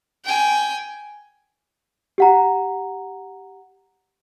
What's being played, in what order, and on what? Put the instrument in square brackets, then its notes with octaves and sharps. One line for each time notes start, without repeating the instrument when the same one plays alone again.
[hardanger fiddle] G5 G#5
[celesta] G4 F#5 A#5